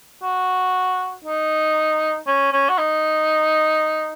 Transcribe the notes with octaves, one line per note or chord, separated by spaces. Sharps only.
F#4
D#4
C#4
C#4
F#4
D#4